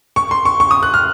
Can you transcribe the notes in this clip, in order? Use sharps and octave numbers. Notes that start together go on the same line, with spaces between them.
C#6
C6
C#6
C#6
D#6
F#6
F6